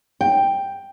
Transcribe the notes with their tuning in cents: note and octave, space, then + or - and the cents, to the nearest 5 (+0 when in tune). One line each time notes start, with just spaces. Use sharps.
G5 +5